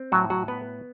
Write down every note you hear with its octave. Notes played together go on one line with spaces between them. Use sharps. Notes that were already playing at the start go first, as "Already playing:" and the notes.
Already playing: C4
A2 F#3 F#4
F#3 F#4
B3 B4